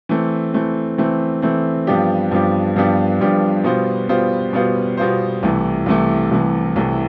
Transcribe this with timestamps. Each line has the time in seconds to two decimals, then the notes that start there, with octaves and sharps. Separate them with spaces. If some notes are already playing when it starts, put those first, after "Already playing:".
0.09 E3 A3 C4
0.53 E3 A3 C4
0.98 E3 A3 C4
1.42 E3 A3 C4
1.87 G2 F3 B3 D4 G4
2.32 G2 F3 B3 D4 G4
2.76 G2 F3 B3 D4 G4
3.21 G2 F3 B3 D4 G4
3.64 B2 G3 B3 F4 C5
4.09 B2 G3 B3 F4 C5
4.53 B2 G3 B3 F4 C5
4.97 B2 G3 B3 F4 C5
5.43 C2 C3 E3 A3
5.86 C2 C3 E3 A3
6.31 C2 C3 E3 A3
6.76 C2 C3 E3 A3